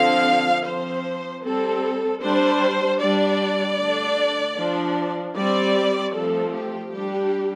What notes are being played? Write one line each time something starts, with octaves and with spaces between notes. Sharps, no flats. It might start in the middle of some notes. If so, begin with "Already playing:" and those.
Already playing: D3 F3 C4 F5
F3 C4 C5
G3 C4 A4
G3 D4 C5
G3 D4 D5
D3 A3 D4
F3 D4
G3 C4 D5
F3 A3 C4 A4
G4
G3 D4 G4